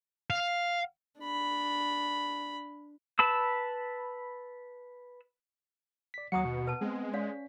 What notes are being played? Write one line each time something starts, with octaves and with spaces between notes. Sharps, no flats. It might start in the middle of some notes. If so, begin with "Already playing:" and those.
F5
D4 B5
B4 A5 B5 E6
D5 B6
D#2 F#3 F#4 F#5 A#5 D#6 C#7
B2
B4 A5
G#3 B3 C4
C#4 D5 F5 B6